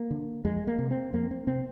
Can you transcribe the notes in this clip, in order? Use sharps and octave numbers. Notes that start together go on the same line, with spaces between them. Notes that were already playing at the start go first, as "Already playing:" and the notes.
Already playing: A#3
D3
F2 G#3
A#3
C3
C4
F2 A#3
C4
C3 C4